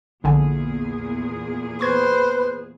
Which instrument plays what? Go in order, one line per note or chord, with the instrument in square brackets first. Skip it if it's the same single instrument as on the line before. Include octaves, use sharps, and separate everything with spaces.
[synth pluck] A#1 D3 G#5 [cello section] E2 A#2 G#4
[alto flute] B4 [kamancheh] C5 [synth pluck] C#6 G#6